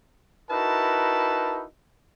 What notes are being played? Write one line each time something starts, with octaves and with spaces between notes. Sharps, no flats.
D#4 E4 F#4 A#4 B4 A5